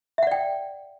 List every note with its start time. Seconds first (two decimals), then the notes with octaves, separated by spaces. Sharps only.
0.18 E5
0.23 F#5
0.27 D5
0.32 G5